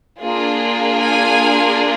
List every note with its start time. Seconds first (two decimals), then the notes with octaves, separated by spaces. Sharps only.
0.21 A#3 D4 F4 G#4
1.00 F5 G#5